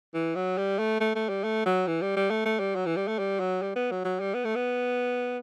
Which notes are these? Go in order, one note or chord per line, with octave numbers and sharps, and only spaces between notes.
E3
F#3
G3
A3
A3
A3
G3
A3
F#3
E3
G3
G3
A3
A3
G3
F#3
E3
G3
A3
G3
F#3
G3
B3
F#3
F#3
G3
B3
A3
B3